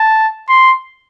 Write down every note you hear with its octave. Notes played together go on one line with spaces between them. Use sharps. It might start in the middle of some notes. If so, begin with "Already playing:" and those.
Already playing: A5
C6